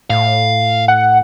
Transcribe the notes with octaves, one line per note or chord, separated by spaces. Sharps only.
A2 F5
F#5